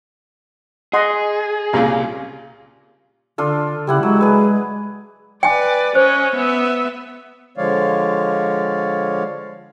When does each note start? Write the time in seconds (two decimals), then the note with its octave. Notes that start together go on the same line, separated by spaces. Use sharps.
0.93 G#4 D#5 F#5 C6
1.73 C2 A#2 C#3 G4 A#5
3.38 D3 D4 F4 A4
3.87 C#3 G3 E4 F#5
4.03 F#3 G#3
4.21 G#4 B4
5.43 B4 D5 G5 G#5
5.95 C#4 C5 D#5
6.36 B3 E5
7.57 D3 F3 G#3 C#5 D5 F5